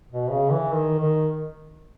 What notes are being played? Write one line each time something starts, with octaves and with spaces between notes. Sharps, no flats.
B2
C#3
E3
D#3
D#3